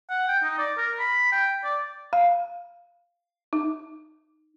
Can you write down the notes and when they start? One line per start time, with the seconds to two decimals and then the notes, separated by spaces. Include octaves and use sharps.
0.10 F#5
0.28 G5
0.43 D#4
0.58 D5
0.78 A#4
0.99 B5
1.32 G5
1.64 D5
2.13 F5
3.53 D#4